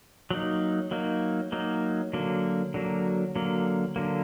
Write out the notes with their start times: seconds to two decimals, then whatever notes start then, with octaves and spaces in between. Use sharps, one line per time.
0.30 F#3 A#3 D#4
0.91 F#3 A#3 D#4
1.52 F#3 A#3 D#4
2.13 D3 F#3 A#3
2.74 D3 F#3 A#3
3.36 D3 F#3 A#3
3.96 D3 F#3 A#3